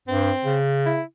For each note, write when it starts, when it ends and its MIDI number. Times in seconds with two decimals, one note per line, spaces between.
0.08 0.32 43
0.08 0.56 60
0.45 1.00 49
0.86 1.02 64